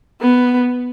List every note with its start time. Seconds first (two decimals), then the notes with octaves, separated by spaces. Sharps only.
0.21 B3